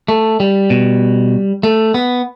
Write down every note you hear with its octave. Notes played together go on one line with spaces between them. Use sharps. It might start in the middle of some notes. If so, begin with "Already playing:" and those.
A3
G3
B2
A3
B3